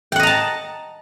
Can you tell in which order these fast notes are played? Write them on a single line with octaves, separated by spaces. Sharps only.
G5 F#5 D#5 A#5 A5